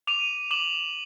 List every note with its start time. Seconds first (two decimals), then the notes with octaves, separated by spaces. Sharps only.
0.07 D6 D#7 F7
0.51 D6 E7 F#7